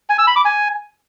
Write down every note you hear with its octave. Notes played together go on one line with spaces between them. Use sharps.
G#5
E6
B5
D6
G#5